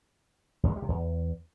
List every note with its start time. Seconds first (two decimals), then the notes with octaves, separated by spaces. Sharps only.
0.63 E2
0.70 G#3
0.76 G3
0.82 C3
0.89 E2